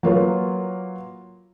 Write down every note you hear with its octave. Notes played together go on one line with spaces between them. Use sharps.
F#3 A#3 F4 A#4 B4 C#5